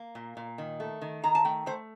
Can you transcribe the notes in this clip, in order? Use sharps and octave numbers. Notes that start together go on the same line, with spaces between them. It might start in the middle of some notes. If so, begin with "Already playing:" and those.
Already playing: A#3
A#2
A#2
D#3
A3
D#3
D#3 A#5
A5
A3 G5
A3 C5